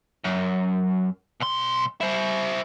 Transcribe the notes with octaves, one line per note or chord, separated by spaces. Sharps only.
F#2
B1 C6
E4 C5